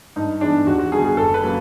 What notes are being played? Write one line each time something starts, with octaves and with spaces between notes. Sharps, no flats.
G2 D#4
E3 G#3 B3 D4
D#2 F#4
F#4
D3 G3 B3 G#4
G#4
F#1 A4
B4
C#3 F#3 A#3